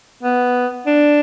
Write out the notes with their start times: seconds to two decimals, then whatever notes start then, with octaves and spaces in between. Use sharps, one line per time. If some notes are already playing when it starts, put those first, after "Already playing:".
0.23 B3
0.86 D4